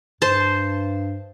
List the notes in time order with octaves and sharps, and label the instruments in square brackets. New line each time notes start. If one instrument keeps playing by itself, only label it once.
[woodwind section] G2 [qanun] C5 A5